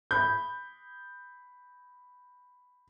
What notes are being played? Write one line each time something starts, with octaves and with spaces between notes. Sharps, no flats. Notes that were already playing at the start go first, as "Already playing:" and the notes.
B5 G6